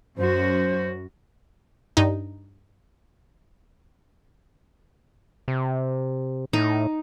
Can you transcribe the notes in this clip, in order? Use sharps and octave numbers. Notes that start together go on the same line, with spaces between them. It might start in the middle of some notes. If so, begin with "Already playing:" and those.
F#2 C#4 F#4 C5
G2 D#4
C3
A2 D#4